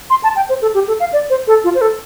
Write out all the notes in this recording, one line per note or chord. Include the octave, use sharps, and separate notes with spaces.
C6
A5
G5
C5
A4
G4
A4
F5
D5
C5
A4
F4
C5
A4